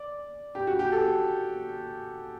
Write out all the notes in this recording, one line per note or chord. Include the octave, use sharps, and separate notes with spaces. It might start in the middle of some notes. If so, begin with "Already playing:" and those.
Already playing: D5
G4
F#4
G4
A4